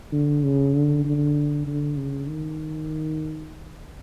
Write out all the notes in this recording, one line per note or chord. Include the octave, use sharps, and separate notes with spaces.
D3
C#3
D3
D3
D3
C#3
D#3